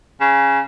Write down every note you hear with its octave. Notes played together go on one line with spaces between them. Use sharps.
C#3